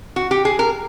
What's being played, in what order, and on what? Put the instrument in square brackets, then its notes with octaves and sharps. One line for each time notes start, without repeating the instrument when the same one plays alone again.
[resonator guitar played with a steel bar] F#4
G4
G#4
A#4